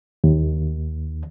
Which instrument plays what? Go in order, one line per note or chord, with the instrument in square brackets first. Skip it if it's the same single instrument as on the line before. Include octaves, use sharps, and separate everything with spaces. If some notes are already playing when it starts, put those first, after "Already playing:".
[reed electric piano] D#2